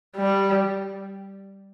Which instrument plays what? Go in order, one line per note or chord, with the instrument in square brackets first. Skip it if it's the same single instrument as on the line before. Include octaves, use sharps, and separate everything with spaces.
[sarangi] G3